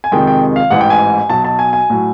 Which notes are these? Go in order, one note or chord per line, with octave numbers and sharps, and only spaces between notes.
G#5
F2 C3 D#3 G#3 G5
G5
F5
A1 G#2 E3 F#5
G5
G#5
B1 B2 F#3 A5
A5
G#5
G#5
A2 F#3